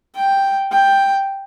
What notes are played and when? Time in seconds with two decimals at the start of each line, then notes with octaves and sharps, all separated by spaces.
0.16 G5
0.72 G5